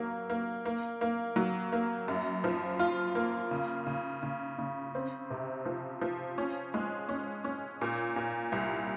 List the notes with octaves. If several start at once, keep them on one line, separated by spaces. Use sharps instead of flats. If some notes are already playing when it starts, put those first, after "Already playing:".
Already playing: F#3 A#3
A#3
A#3
A#3
F#3
A#3
F#2
F3
F4
A#3
C#3
C#3
C#3
C#3
C4
C3
F3
F3
C#4
G#3
C#4
C#4
A#2
A#2
C2